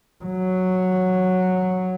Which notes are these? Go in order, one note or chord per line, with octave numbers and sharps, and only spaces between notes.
F#3